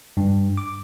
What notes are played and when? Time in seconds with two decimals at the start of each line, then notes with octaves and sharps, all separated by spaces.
0.17 G2
0.57 D6